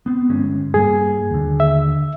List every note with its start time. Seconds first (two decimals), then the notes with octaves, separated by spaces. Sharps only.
0.06 B3 C4
0.29 G1 G#3 C#4
0.74 G2 G3 A#3 G#4
1.30 D#2 D3
1.60 E5